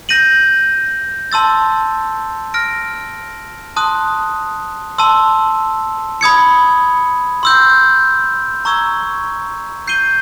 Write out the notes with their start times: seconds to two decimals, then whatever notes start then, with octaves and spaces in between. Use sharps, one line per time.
0.09 G6 A#6 D#7 F#7
1.32 A5 C6 E6 A6
2.54 F6 A#6 D7
3.76 A5 C6 D#6 F#6
4.98 A5 C6 E6
6.21 B5 D#6 G#6 C#7
7.43 C6 E6 G6
8.65 A#5 C#6 E6 G#6
9.87 G6 C7 D#7 G7